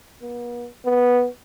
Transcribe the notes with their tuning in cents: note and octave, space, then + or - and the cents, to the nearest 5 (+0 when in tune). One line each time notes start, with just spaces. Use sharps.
B3 -45
B3 -5